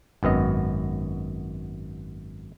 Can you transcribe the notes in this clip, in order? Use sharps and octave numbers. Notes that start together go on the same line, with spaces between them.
G#1 F#2 B3 D#5